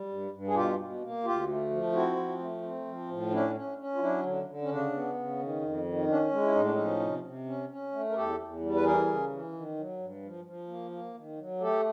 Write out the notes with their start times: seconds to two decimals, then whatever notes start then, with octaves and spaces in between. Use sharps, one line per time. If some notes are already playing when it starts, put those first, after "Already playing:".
Already playing: G3
0.09 G2
0.31 G2
0.47 G#4
0.54 B2 F4 G4
0.77 B2
1.00 A#3
1.24 D2 F4 G4
1.47 A3
1.70 F3
1.92 C4 E4 F#4
2.16 F3
2.38 A3
2.62 C4
2.86 F3
3.08 A2
3.31 C#4 D4 E4
3.55 C#4
3.78 C#4
3.95 F4
4.00 F#3 D4 E4
4.23 D3
4.46 D3
4.62 C#4
4.69 C#3 D4
4.92 B3
5.15 C#3
5.39 D#3
5.61 F2
5.84 D#3
6.07 C#4 D4
6.31 G#3
6.42 E4
6.52 A2 D#4
6.62 D4
6.72 F3 C#4 D#4
6.99 C3
7.22 C3
7.46 C#4
7.69 C#4
7.92 A3
8.10 A#4
8.14 E2 G4 A4
8.38 E2
8.61 G3
8.75 B4
8.83 E3 G#4 A#4
9.07 C#3
9.29 E3
9.52 D#3
9.76 F#3
9.98 G2
10.23 F3
10.44 F3
10.68 A#3
10.91 A#3
11.14 D#3
11.37 F#3
11.60 A3 G4 A4